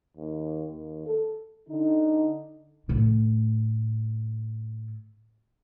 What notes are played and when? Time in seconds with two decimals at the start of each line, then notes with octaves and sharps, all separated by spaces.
0.17 D#2
0.69 D#2
1.06 A4
1.69 D3 D#4
2.88 A2 D3